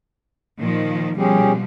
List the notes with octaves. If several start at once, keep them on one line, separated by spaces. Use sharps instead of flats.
A#2 D#3 F3
B2 F3 G3 C#4 G4 G#4